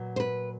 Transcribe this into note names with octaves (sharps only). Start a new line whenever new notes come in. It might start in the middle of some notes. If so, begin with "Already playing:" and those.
Already playing: A#2 F#3 B3
C5
B4